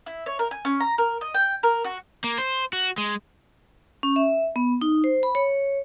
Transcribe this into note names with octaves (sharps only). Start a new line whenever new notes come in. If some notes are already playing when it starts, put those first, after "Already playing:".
E4
C#5
A#4
G#5
C#4
A#5
A#4
D#5
G5
A#4
F#4
A#3
C5
F#4
G#3
C#4
E5
B3
D#4
C5
B5
C#5